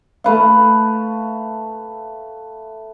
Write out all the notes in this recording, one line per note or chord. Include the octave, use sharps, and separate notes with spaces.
A3 B4 F5